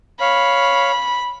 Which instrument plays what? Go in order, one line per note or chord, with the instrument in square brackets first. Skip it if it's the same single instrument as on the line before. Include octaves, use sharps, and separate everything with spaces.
[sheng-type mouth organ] C#5 F5 [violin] B5